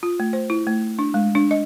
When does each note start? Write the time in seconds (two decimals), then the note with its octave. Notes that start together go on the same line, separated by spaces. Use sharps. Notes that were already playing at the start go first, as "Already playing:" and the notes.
0.03 F4
0.20 A3
0.33 C5
0.50 E4
0.67 A3
0.99 D4
1.14 G#3
1.35 D4
1.51 D#5